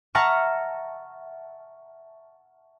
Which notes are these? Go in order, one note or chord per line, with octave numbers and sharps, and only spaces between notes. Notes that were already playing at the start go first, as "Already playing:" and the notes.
E5 F#5 A5 A#5 C#6 F6